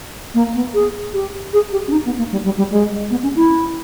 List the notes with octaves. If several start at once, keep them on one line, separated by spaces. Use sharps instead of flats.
A#3
B3
G#4
G4
G#4
G4
C#4
D#4
B3
A#3
G3
G3
G3
G#3
B3
C#4
E4